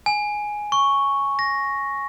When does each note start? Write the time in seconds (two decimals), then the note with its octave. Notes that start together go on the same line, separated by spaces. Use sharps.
0.06 G#5
0.72 C#6
1.39 A#6